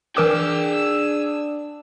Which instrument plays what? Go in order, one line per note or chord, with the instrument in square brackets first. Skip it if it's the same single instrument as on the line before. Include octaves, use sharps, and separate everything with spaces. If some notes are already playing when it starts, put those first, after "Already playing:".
[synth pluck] E3 A#4 D6 [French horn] D4 [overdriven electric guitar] G#4 G5 [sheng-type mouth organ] E6